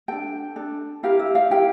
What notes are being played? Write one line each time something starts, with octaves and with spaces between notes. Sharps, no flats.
D4 A4 G5
D4 A4
E4 G4 A#4 F5
E5
F5
E4 G4 A#4 G5